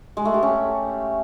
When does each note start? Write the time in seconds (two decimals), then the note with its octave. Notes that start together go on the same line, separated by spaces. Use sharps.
0.17 G#3
0.25 A3
0.34 G4
0.43 C#4